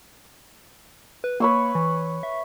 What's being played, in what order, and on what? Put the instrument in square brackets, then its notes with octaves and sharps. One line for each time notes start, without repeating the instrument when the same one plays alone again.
[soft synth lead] B4
[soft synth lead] A#3 [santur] B4 C#5 E6
[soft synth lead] E3
E5